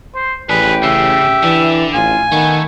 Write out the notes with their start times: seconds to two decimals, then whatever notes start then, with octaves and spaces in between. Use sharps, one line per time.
0.15 C5
0.49 A1 D4 G4 G#4 B4
0.84 C#3 E5
1.43 D3 E3
1.94 A1 F4 G#5
2.32 D#3 A3 B3